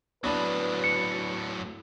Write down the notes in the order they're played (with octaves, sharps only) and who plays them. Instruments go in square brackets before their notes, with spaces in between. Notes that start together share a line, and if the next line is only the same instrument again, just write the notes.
[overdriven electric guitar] A2 F#3 [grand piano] B3 D4 B5 [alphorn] B4
[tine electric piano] C#7